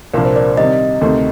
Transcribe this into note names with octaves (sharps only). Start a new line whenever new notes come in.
C2 A#2 F3 A#3 D4 A#4
C5
D5
C3 D#3 G3 D#5
D2 C3 D#3 A3